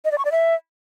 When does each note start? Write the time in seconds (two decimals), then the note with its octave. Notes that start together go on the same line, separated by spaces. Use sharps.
0.05 D#5
0.11 D5
0.18 C#6
0.25 D5
0.32 E5